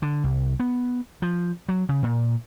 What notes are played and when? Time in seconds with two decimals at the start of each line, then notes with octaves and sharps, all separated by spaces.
0.02 D3
0.24 C2
0.60 B3
1.22 F3
1.69 F#3
1.89 C#3
2.03 A#2